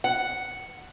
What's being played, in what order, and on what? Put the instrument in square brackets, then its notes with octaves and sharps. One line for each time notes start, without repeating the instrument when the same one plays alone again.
[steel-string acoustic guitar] F#5